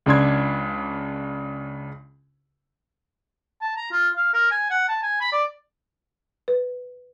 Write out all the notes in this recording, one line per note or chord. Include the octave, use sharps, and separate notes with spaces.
C#2 C#3 D4 C6 G#6
A5
A#5
F4
F5
A#4
G#5
F#5
A5
G#5
B5
D5
B4